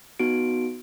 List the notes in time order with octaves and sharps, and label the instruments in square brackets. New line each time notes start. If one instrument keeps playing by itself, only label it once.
[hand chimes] B3 D#4 F#4 D7